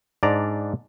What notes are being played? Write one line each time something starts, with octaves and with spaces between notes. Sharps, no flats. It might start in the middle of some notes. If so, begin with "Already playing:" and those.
G#2 D4 D5 A#5